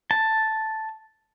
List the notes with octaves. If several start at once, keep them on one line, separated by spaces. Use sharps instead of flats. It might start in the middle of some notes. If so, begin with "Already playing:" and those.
A5